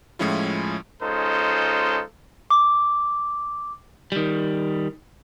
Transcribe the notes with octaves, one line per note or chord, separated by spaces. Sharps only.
A2 F3 G#3 C#4 E4 F4
G#3 C#4 D#4 F4 A4 C5
D6
D#3 G3